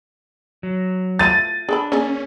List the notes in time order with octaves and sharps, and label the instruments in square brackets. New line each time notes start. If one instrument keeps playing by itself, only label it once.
[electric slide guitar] F#3
[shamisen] F3 A3 E4 [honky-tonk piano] A6 D#7
[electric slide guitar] D4 [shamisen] G#4 A4 B5
[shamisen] A#3 G#4 D5 [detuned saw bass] C#4